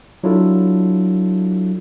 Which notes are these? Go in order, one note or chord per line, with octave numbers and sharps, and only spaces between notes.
F#3 D4 E4 F4 A4